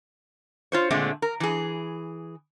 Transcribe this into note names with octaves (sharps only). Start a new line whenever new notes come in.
F4 C5 C#5
A#2 D3 G#3 A3 C4
A#4
E3 G#4